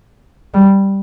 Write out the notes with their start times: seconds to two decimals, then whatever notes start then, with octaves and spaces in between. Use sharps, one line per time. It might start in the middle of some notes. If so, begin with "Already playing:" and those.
0.54 G3